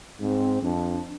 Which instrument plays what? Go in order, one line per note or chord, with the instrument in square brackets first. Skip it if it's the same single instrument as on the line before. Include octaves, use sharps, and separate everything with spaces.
[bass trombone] G#2 [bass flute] C4
[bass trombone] F2 [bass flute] D4